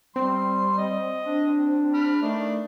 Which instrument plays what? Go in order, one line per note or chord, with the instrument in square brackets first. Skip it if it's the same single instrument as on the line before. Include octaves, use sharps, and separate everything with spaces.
[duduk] G3 [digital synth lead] C4 [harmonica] C6
[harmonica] D#5
[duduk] D4
[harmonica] B5 F6
[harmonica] D#3 D4 [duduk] A3